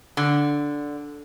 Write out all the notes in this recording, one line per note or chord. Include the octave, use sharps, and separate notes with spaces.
D3